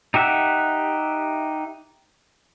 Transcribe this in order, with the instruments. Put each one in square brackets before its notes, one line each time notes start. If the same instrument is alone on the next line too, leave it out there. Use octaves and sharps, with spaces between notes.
[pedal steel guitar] D#4 G4 E5 F#5